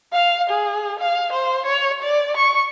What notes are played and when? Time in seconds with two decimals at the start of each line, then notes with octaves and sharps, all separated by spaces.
0.13 F5
0.50 G#4
0.99 F5
1.32 C5
1.66 C#5
2.02 D5
2.37 C#6